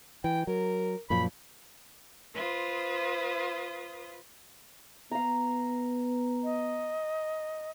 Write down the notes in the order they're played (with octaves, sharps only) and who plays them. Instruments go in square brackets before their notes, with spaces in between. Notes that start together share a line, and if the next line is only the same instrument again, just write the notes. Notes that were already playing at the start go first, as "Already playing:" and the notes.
[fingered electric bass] E3 [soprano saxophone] G5
[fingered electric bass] F#3 [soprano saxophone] A#4
[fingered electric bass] F#2 A#2 F3 [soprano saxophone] B5
[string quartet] F4 B4 C5 D#6
[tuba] B3 [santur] F5 A#5
[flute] D#5